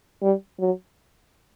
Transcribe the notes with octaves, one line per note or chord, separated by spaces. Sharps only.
G3
F#3